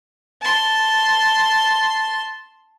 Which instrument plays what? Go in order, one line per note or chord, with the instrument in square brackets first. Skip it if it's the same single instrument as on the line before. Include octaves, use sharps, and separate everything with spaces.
[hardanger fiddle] A5 C6